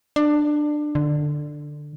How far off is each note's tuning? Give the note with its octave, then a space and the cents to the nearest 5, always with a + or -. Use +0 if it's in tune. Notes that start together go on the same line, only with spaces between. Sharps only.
D4 +20
D3 +10